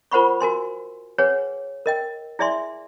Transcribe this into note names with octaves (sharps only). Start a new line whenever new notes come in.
F4 A#4 C5 F#5 B5 C#6
F#4 A#4 G#5 C6
G#4 B4 C#5 F#5 G#5
A#4 D#5 G5
E4 G#4 D5 E5 G#5 C6